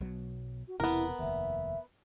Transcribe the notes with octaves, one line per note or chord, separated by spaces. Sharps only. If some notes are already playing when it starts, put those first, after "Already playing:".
B1 B2 F#3
F#4
E1 E2 C3 B3 E4 A#4
F1 D#2 E5